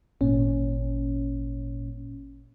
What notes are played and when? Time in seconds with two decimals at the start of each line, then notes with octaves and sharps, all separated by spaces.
0.21 G#1 A#2 C#4